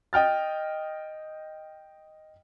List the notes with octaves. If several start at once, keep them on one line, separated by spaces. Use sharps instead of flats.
D#5 G5 F6 A6